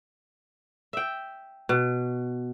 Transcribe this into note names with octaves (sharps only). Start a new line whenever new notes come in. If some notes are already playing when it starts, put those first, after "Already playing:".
E5 G5
B2